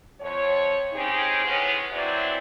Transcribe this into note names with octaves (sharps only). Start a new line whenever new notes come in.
F2 C#5
C#3 C4 C#4 D#4 G4 G#4
A2 G#3 B3 C#4
E3 F#3 C4 E4 D5